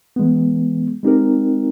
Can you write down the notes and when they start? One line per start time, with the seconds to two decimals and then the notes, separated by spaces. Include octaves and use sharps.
0.16 E3 G#3 B3
1.03 G#3 C4 D#4 G4 A#4